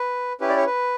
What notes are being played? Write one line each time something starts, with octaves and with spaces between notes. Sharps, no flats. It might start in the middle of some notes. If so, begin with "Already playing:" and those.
Already playing: B4
C#4 E4 G4 B4
D5
C#5
B4